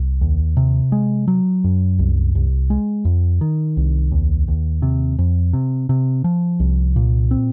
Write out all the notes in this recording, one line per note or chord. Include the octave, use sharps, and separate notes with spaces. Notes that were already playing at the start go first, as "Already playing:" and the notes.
Already playing: C2
D#2
C3
G#3
F#3
F#2
C2
C2
G#3
F2
D#3
C2
D#2
D#2
C3
F2
C3
C3
F3
C2
A#2
C4